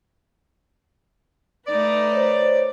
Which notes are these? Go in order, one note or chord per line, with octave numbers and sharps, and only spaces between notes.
A3 D#4 B4 D5
C5 C#5